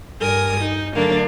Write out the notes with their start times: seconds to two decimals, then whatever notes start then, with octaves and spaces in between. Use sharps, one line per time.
0.20 G2 A#4 G#5 D#6
0.61 D#4
0.95 D3 F#3 A3 A#3 D4